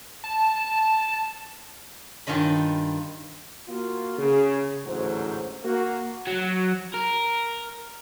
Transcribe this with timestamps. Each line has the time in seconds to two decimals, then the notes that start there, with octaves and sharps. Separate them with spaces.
0.24 A5
2.27 G2 D#3 F4 D#5 B5
3.68 A#3 F4 F#4
4.18 C#3 G#4
4.85 A1 D2 G#2 F#3 C5
5.64 A#3 F#4
6.27 F#3
6.94 A#4